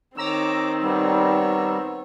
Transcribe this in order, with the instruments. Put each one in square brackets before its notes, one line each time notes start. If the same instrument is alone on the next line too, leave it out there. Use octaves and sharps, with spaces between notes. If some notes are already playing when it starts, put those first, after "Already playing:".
[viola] D#3 C4 [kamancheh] C#5 D6 [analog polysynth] A#5 E6
[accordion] G3 [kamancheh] B3 C#5